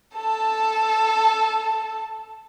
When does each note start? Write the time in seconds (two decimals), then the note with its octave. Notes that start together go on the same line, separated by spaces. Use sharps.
0.15 A4 A5